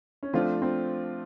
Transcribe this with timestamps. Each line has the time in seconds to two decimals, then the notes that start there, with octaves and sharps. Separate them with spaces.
0.23 C#4
0.33 F3 A3 C4 D4 F4
0.62 C4